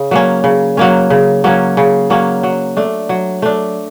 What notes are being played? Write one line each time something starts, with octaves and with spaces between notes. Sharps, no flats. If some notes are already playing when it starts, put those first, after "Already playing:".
Already playing: C#3
F#3 A#3 C#4
C#3
F#3 A#3 C#4
C#3
F#3 A#3 C#4
C#3
F#3 A#3 C#4
F#3
A3 D4
F#3
A3 D4